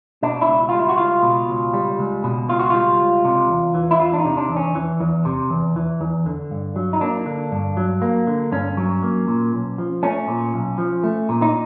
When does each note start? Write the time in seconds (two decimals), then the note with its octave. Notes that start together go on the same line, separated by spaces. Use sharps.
0.23 B2 D4
0.42 E4
0.48 C#2
0.69 G3 F4
0.79 E4
0.89 F#4
0.98 C#2 F4
1.23 B2
1.49 C#2
1.74 G3
1.99 C#2
2.24 B2
2.49 C#2 F4
2.59 F#4
2.70 G3 F4
2.99 C#2
3.25 C3
3.50 E2
3.74 E3
3.91 E4
4.00 E2 F4
4.14 D4
4.19 D#4
4.25 C3
4.37 D4
4.49 E2
4.57 C#4
4.75 E3
5.00 E2
5.25 C3
5.50 E2
5.76 E3
6.01 E2
6.26 D3
6.51 G2
6.76 F#3
6.93 D#4
7.01 A#3 D4
7.26 D3
7.52 G2
7.77 F#3
8.02 A#3
8.27 D3
8.52 G2 C#4
8.77 F#3
9.03 A#3
9.28 A#2
9.53 B1
9.78 F3
10.03 A3 C#4
10.28 A#2
10.54 B1
10.78 F3
11.03 A3
11.29 A#2
11.42 D#4